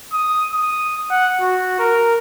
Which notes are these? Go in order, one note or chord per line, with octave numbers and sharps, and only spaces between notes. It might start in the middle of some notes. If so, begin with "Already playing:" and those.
D#6
D#6
F#5
F#4
A#4